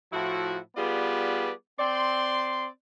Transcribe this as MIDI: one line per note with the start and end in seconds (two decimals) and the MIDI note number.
0.13 0.58 45
0.13 0.58 53
0.13 0.58 64
0.13 0.58 66
0.77 1.50 55
0.77 1.50 59
0.77 1.50 65
0.77 1.50 68
0.77 1.50 71
0.77 1.50 74
1.78 2.67 60
1.78 2.67 74
1.78 2.67 84